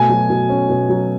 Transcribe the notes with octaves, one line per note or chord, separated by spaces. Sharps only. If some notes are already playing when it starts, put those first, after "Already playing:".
Already playing: B2 A3 G#5
F#3
B2
C#4
B2
F#3